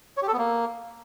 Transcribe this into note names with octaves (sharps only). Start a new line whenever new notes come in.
C#5
G4
A4
B3
A#3